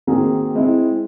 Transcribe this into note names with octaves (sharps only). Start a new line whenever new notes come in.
D#3 A#3 C4 F#4 G#4 A#4
G#3 C4 E4